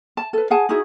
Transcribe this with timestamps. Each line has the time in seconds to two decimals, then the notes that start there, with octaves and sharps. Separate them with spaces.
0.17 A5
0.33 A4 B4
0.50 G#4 F#5 G#5 A5
0.69 D#4 E4 F#4 G#4